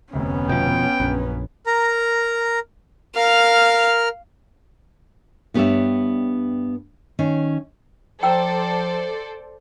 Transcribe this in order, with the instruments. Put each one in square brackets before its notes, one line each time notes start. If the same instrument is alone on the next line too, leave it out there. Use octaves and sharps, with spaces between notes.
[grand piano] F1 D2 [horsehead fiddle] B3 C#4
[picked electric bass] B2 F3 [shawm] G5
[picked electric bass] A#1 [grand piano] F#2 B4
[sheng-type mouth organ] A#4 A#5
[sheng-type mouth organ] A#4 F6 [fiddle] F5
[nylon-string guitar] G2 B3 G4 C#5 D5 E5
D#3 C#4
[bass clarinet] F3 [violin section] A4 C5 D5 [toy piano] G5 A#5 E6